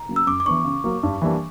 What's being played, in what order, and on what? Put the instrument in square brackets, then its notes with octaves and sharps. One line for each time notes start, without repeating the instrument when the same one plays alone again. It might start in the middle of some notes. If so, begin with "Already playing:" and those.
Already playing: [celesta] A#5
[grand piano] C#3 F#3 A#3
[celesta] E6
[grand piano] F#2 [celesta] D6
[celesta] D6
[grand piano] E3 B3 D4 [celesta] C#6
[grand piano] C#3
F#3 A#3
G2
E3 G3 A#3 D4